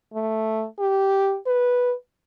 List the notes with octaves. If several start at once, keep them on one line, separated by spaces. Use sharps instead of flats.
A3
G4
B4